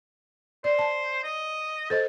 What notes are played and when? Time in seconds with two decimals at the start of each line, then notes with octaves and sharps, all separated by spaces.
0.64 C5 D5
0.79 A5
1.23 D#5
1.90 A4 C5 D#5 A5